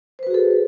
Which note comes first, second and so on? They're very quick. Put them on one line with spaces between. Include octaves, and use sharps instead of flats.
C5 B4 F#4 G#4 A4